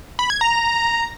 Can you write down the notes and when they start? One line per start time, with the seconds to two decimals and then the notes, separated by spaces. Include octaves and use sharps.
0.19 B5
0.30 G#6
0.41 A#5